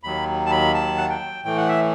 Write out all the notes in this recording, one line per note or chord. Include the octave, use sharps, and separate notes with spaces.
D#2 D#3 F#3 B5
A5
B5
A5
F#5
G5
A2 E3 A3 G5
F#5
E5